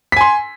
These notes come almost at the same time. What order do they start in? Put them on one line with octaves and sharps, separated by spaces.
B6 G#5 C6